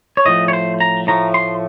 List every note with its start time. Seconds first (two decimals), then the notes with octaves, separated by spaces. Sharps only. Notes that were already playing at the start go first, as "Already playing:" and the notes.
0.17 C#5
0.25 A2 F3 A3 D#5
0.48 C#5
0.53 C5
0.80 A#5
1.07 A2 F3 A3 A#5
1.34 C6